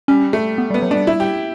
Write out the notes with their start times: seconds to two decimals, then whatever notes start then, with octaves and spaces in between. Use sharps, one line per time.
0.08 G3 C#4
0.33 A3
0.58 B3
0.70 G3
0.74 B3
0.82 F#3
0.90 G3 A3 D4
1.07 E4
1.20 G4